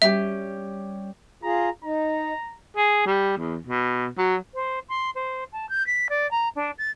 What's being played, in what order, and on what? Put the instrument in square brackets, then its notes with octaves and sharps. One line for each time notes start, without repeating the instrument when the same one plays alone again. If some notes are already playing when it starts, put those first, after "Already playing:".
[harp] G3 C#4 G4 [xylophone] E5
[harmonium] F4 G#4 [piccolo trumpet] A#5
[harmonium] D#4 [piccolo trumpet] A#5
[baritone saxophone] G#4
G3
E2
B2
F#3
[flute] C5
C6
C5
A5
G6
B6
D5
A#5
D4
A6